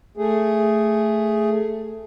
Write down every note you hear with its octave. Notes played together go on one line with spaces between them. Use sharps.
A3 G#4